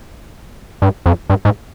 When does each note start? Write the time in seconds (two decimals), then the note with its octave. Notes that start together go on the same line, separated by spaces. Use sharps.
0.82 G2
1.06 F2
1.30 G2
1.45 G#2